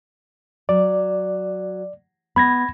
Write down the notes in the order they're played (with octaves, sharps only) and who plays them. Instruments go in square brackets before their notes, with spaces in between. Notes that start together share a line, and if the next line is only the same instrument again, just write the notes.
[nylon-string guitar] F#3 [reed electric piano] D5
[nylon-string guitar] B3 [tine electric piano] B5 G#6 A#6